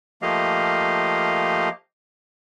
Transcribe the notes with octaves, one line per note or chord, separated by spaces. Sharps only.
F3 A3 A#3 G4 D#5 F5